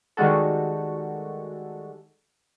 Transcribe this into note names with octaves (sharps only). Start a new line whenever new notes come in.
D#3 G3 G#3 F#4 A4